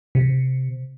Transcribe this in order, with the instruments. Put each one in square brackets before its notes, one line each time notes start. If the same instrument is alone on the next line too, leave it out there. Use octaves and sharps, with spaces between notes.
[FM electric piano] C3